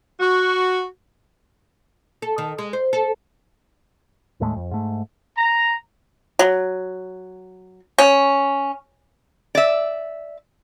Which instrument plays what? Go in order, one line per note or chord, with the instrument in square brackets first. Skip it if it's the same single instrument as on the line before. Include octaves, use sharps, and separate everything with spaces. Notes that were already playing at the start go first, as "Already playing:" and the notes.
[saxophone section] F#4
[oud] A4
D#3
G#3
C5
A4
[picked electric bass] D#2 A2 G#3 A3
F2
G#2 A3
[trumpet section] A#5
[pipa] F#3
C#4
[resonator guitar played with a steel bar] D5 E5